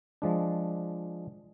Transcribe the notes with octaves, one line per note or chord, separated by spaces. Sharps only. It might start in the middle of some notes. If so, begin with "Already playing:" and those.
F3 G#3 D4